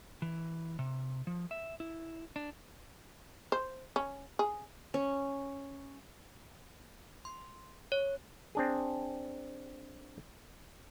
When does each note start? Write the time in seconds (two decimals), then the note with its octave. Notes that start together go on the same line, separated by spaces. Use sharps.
0.22 E3
0.79 C3
1.27 F3
1.51 E5
1.80 E4
2.36 D4
3.52 C5
3.96 C#4
4.39 G#4
4.94 C#4
7.25 C6
7.92 C#5
8.55 C4 D4 G#4